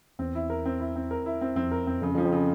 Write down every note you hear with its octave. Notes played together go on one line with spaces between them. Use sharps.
E2 C4
E4
A#4
C4
E4
C4
A#4
E4
C4
F2 C4
A#4
C4
F2 C#3
F2
F3
F2
C#3